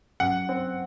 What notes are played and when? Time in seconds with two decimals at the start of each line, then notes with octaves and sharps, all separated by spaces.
0.20 F#2 F#5
0.49 C4